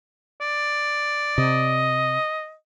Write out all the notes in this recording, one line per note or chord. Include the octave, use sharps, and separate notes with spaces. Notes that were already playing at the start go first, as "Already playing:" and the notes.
D5
C3 D#5